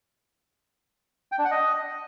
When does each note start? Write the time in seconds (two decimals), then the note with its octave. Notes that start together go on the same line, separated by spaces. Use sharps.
1.32 G5
1.38 D4
1.45 F#5
1.51 D#5